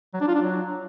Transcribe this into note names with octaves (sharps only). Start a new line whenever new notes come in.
F#3
D4
F4
D4
F#3